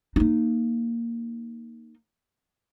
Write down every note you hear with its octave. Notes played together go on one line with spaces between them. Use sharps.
A#3 D#4